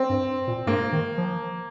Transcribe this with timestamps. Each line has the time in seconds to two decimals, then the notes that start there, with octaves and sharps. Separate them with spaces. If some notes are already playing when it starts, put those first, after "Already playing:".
Already playing: C4
0.09 G2
0.47 A#2
0.66 G2 A#3
0.92 D#3
1.18 F3